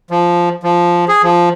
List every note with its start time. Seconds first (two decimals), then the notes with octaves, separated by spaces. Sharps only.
0.11 F3
0.63 F3
1.08 G#4
1.23 F3